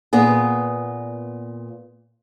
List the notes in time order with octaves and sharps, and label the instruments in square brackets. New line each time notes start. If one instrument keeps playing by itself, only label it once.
[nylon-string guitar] A#2 B3 G#4